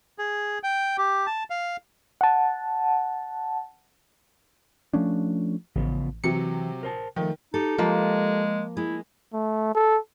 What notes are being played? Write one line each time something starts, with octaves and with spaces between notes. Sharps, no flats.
G#4
G5
G4
A5
F5
F#5 A5
F3 A3 C#4 D4
A1 C#3 F3 B3
C3 E3 F#3 C#7
A#4 C5 A5
D#3 F3 A3
D#4 G4 A4
F3 G#3 A#3
G#3 E4
A3
A4